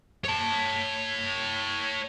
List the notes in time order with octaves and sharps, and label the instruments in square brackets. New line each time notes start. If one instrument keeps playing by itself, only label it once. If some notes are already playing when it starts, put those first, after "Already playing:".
[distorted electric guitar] C#5 A5